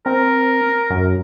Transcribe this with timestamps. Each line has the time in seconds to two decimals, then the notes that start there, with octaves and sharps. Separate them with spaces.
0.06 C4 A#4
0.90 F#2